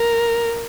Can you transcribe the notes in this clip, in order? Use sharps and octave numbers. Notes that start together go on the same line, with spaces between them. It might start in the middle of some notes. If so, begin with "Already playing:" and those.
Already playing: A#4